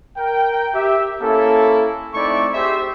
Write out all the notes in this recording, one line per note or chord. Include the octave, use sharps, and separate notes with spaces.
A#4 G5
G4 E5
A#3 C#4 E4 A4
A3 C4 D#4 E4 D5 C#6
G4 G#4 C5 E5